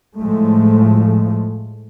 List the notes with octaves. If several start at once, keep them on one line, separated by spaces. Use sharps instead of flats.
A2 F3 G#3 A3